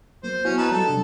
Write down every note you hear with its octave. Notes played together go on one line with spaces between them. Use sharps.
F#3 A#3 C5
B3 C#4 E4 F#4
D#4 B4 A5
F#3 G3 A4 A5
C3 D4